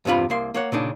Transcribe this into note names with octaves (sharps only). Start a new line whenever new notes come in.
E2 G2 C3 F4 B5
C2 A#3 C6
A#3 C#5 F#5
A#2 C#3 D4 D#4